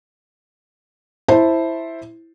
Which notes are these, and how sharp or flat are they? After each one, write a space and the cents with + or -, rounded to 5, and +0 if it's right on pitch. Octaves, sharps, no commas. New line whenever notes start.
E4 +0 C5 +5 A5 +0